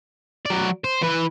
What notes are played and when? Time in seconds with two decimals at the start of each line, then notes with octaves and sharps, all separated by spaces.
0.46 F#3 D5
0.84 C5
1.02 E3 B4